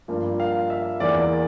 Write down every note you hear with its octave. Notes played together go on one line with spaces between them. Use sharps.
G2 F3 A#3
F5
E5
E2 E3 A#3 D5